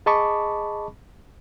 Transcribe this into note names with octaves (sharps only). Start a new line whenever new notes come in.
G#4 D#5 A5 B5 C#6 D6